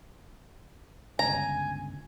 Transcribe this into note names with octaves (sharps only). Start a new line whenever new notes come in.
G1 C#2 G#5 A#5